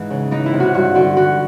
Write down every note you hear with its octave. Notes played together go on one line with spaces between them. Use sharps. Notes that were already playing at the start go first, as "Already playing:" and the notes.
Already playing: G#2 E3 D#4
C#3
E3 D#4
E4
C3
F#4
G2 F#4
D3 F#4
E3 F#4